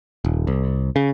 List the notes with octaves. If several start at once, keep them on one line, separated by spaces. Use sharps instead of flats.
D#1
C2
C#3